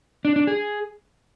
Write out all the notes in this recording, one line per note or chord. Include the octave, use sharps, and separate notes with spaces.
D4
D4
G#4